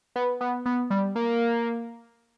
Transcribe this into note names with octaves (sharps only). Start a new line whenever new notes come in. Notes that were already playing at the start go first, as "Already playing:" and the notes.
B3
B3
B3
G3
A#3